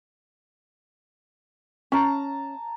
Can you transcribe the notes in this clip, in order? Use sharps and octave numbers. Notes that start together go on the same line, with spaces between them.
C#4 A5 A#5